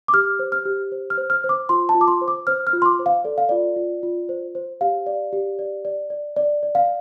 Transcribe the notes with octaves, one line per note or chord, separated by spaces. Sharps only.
D6
G4 F6
C5
F6
G4
C5
F6
C5
F6
C5
D6
F4 C6
A5
F4
D6
C6
C5
D6
C5 F6
F6
F4
C6
D6
C5
F5
A4 D5
F5
F4 D5
F4
F4
C5
C5
G4 F5
D5
G4
D5
D5
D5
D5
D5
F5